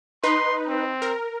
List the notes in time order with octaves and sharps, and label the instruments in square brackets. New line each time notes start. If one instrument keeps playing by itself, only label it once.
[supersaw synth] D#4 B4 [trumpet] C6
[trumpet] C4
[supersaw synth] A#4